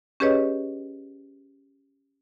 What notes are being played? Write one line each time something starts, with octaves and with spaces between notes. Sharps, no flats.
C#4 G4 G#4 B4 C#5 D#5